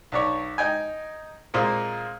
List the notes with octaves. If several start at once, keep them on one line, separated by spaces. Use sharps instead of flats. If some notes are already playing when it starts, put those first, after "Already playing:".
B1 D4 C#5
D#4 G5 G#5
A#2 G#3 A#3 C4